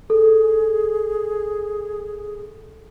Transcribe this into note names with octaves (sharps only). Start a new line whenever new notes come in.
G#4 A4